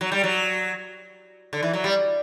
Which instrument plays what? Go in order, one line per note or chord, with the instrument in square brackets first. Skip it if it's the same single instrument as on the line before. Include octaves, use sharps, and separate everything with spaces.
[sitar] F#3
G3
F#3
D3
E3
F#3
G3